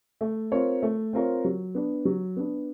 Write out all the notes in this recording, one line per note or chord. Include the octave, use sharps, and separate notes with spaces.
A3
C4 F4 A#4 C#5
A3
C4 F4 A#4 C#5
F#3
B3 D4
F#3
B3 D4